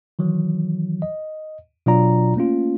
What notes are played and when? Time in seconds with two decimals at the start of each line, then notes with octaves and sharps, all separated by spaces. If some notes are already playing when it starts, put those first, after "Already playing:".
0.19 D#3 E3 F#3
1.02 D#5
1.86 B2 F#3 D4 F4 D5 A#5
2.36 A3 A#3 C#4 F4